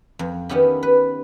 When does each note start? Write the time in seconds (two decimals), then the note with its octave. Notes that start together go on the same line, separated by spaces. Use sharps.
0.19 F2
0.49 D#3 B3 C#4 E4 G4
0.83 B4